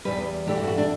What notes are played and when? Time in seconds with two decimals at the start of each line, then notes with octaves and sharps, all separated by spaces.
0.05 E2 B2 G3 B4
0.47 G2 E3 A3 D4 G4
0.57 F#4
0.67 F#4
0.78 D4